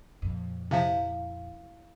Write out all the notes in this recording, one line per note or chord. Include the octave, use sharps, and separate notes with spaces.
F2 A#2
C3 F3 E4 F5